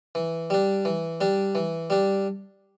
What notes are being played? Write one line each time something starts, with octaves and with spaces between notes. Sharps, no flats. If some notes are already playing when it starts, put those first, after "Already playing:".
E3
G3 D4
E3
G3 D4
E3
G3 D4